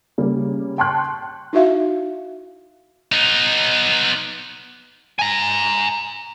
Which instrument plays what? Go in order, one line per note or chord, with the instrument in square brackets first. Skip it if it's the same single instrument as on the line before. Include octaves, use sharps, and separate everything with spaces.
[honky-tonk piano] C#3 G3 A#3
G5 A5 C6 C#6 F#6 G6
[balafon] D#4 E4 F#4 E5 F5
[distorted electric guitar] B3 D#4
G#5 A#5